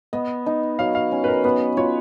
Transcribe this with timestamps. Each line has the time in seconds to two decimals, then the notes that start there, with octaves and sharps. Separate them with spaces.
0.13 B3 D#5
0.46 D#4
0.79 F#3 F5
0.95 F5
1.12 C#4
1.24 B4
1.28 A#4
1.44 B3 B4
1.77 F4 C#5